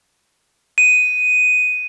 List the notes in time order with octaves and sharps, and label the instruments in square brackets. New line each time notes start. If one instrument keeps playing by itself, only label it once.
[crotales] D#7